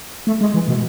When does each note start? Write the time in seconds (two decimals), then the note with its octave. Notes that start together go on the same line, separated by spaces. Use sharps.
0.27 A3
0.41 G#3
0.54 E3
0.68 B2